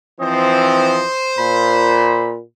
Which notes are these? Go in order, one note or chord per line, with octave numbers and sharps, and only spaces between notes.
E3 F3 C4 C5 D#5
A#2 B5